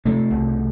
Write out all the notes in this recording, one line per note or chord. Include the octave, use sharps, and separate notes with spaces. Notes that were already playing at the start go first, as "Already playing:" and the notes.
C3 A3
C2